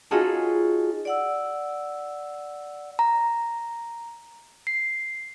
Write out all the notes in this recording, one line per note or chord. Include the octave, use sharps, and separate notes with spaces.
C#4 D#4 F4 F#4 G#4 A4
D5 F#5 E6
A#5
C7